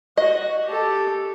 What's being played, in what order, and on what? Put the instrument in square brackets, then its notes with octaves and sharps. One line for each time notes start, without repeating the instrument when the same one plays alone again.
[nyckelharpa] F#4 [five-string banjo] D#5
[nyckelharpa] G4 A4